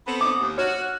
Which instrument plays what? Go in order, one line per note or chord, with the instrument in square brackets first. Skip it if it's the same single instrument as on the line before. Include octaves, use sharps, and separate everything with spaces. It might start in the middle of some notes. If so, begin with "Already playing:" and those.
[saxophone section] B3 C4 A4 [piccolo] B5
[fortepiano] D6 [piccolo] D#6
[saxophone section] D#2
[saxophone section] F#4 [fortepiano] C#5 [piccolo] F6
[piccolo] F#6